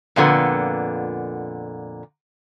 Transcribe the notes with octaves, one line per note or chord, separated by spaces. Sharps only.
F2 A#2 D3 B3